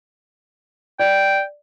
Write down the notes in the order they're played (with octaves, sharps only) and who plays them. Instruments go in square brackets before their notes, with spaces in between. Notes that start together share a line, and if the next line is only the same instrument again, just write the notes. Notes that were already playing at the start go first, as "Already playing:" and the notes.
[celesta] D5 [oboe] G5